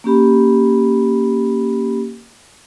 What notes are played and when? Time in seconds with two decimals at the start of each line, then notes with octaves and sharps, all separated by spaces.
0.04 A#3 C#4 G4 B5